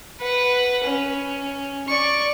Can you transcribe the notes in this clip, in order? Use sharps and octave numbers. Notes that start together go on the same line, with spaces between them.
B4 F#5
C#4
D5 C#6